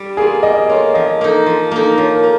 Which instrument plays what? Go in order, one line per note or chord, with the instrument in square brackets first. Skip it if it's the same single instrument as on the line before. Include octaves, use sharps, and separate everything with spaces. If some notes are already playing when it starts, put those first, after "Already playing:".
Already playing: [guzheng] G3
[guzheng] A#3 F4 [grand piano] G#4
[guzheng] G3 [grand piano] D#5
[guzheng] A#3 F4 [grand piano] C#5
[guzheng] F3 [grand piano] D#5
[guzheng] A#3 D#4
F3
A#3 D#4
[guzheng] F3 [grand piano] C#5
[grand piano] A#4
[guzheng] A#3